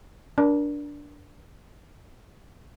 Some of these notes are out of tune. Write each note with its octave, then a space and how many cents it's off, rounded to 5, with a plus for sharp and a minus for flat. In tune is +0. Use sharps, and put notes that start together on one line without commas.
D4 -10 A#4 +30